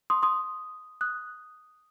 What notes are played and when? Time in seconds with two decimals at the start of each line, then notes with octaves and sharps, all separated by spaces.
0.10 C6 D#6
0.22 C6 D#6
1.01 D#6 F#6